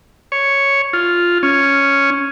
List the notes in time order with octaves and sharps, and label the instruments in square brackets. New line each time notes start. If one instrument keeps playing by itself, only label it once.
[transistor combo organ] C#5
F4
C#4